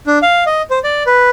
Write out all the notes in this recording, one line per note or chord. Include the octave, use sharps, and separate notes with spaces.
D4
F5
D#5
C5
D5
B4